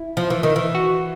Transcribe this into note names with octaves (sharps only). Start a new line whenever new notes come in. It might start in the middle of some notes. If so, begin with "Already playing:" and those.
Already playing: E4
F3
E3
D#3
E3
F#4